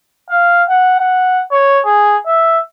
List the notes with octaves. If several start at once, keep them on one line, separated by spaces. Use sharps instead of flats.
F5
F#5
F#5
C#5
G#4
E5